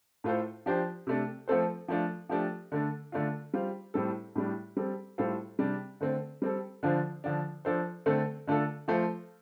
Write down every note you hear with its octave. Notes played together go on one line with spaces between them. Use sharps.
A2 A3 F4 A4 C5
F3 D4 G4 C5
C3 A3 D4
F3 A3 C4 A4 C5
F3 A3 D4 F4
F3 A3 D4 G4
D3 A3 D4
D3 A3 D4 F4
G3 F4 C5
A2 G3 C4 A4
A2 G3 D4
G3 C4 A4
A2 G3 F4 A4 C5
C3 G3 D4
D3 A3 C4
G3 C4 A4
D3 F3 D4 F4 C5
D3 F3 D4
F3 D4 A4 C5
D3 A3 C4 A4
D3 A3 D4 F4 A4
F3 A3 F4 C5